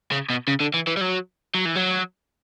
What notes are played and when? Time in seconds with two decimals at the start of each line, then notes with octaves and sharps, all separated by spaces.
0.11 C#3
0.30 B2
0.48 C#3
0.60 D3
0.74 E3
0.87 E3
0.97 G3
1.01 F#3
1.55 F#3
1.65 E3
1.76 F#3